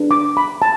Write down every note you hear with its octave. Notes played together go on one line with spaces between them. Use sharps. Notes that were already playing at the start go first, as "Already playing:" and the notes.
Already playing: D4 G#4 B4
D6
B5
A5